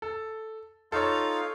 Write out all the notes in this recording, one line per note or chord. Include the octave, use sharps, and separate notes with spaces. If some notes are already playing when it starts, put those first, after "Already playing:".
A4
D#4 F4 A4 C#5 F5